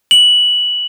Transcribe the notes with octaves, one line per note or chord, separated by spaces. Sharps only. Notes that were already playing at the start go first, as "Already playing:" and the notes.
F#7